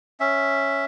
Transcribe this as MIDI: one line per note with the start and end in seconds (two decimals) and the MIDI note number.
0.20 0.85 61
0.20 0.85 76